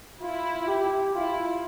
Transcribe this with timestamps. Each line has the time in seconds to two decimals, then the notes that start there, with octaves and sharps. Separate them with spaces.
0.21 E4 F4
0.67 G4
1.15 E4 F4